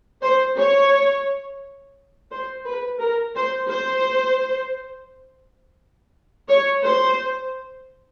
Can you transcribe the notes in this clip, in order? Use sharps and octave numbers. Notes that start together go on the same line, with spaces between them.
C5
C#5
C5
B4
A#4
C5
C5
C#5
C5